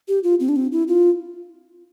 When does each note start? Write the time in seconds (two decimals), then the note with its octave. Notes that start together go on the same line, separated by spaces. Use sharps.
0.08 G4
0.24 F4
0.40 C4
0.49 D4
0.56 C4
0.72 E4
0.88 F4